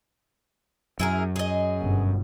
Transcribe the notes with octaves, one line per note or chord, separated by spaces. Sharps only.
F#2 E4 G#4 A#4
G#4 D#5
G1 G2 B2